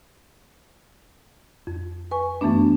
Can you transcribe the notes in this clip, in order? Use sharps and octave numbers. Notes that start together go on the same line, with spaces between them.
F2
B4 G#5 C#6
F#2 E3 A3 B3 D4